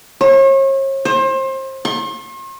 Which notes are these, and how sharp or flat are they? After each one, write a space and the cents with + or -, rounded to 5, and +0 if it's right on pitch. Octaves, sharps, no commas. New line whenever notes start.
C#5 -40
C5 +30
C6 +45